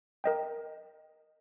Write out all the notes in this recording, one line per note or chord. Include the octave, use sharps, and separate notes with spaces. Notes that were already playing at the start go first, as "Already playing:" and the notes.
A#4 D#5 G5